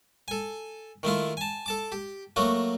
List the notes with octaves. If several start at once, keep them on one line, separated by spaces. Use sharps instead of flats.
A4 G#5
D#3 A3 E4 F4
G#5 A5
A4 A5 D6
G4
F#3 A3 A#3 F#4